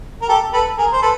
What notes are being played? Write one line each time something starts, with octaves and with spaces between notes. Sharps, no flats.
A#4
G4 A4
A4 B4
G#4 A#4
C5
A4 B4